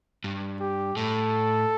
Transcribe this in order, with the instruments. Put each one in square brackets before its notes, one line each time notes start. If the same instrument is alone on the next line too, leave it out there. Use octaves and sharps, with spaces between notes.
[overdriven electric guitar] G2
[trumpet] G4
[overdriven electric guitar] A2 [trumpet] A4